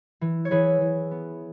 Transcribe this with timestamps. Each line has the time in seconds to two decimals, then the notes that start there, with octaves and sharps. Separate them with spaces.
0.21 E3
0.45 C#5
0.51 E3 G#4 B4
0.81 E3
1.11 B3